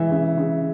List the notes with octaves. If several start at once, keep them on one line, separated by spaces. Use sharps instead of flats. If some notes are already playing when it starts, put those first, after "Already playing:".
Already playing: E3 G#3 E5
C#3
C#3